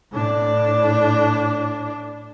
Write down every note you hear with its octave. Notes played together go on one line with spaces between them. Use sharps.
A2 D4